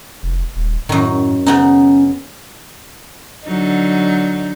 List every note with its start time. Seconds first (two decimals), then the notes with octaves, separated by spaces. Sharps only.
0.23 F1
0.56 D#1
0.89 F#2 A2 D#3
1.46 C#3 B3 C#4 D#4
3.45 D3 F#3 D#4